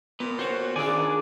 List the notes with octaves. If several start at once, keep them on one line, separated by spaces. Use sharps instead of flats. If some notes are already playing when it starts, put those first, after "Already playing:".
A#2 B3
F#4 C5 C#5
C#2 D#3 D4 F4 G#4 D5 G#5